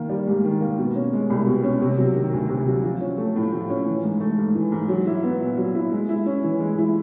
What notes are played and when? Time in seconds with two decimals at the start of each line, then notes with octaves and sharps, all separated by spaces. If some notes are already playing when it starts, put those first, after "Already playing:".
Already playing: D#3 A#3
0.09 G3
0.27 G#2
0.44 D#3
0.61 A#3
0.78 B2
0.96 C#4
1.13 G#3
1.30 C2
1.47 B2
1.64 C#4
1.82 C3
1.98 F#3
2.16 D#3
2.33 D2
2.49 C3
2.67 F#3
2.84 F3
3.01 C#4
3.18 A3
3.36 A2
3.53 F3
3.70 C#4
3.86 E3
4.04 G#2
4.20 A3
4.38 G#2
4.55 E3
4.72 G#2
4.89 F#3
5.07 E4
5.24 B3
5.40 A#2
5.57 F#3
5.75 E4
5.92 G#3
6.09 E4
6.26 C#4
6.44 E3
6.60 G#3
6.78 E4